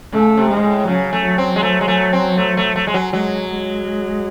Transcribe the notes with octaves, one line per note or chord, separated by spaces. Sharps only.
C#3 A3
C3
G#3
G#2
A2
C#3 F#3
A3
F#3
C4
G#3
A3
G#3
A3
C4
A3
A3
A3
G#3
F#3
F#3 G#3
G#3